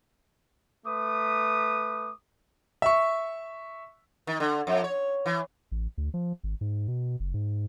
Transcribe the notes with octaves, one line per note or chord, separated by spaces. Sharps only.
A3 B4 D6 D#6
E5 C#6
D#3
D3
F2
C#5
E3
A1
D2
F3
G#1
G#2
B2
F#1
G#2